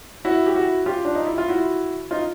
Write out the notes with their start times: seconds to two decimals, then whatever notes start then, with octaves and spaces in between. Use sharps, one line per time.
0.25 E4 F#4
0.47 G4
0.55 E4 F#4
0.86 F4 G4
1.05 D4
1.15 D#4
1.27 E4
1.38 F4
1.48 E4 F#4
2.11 D#4 F4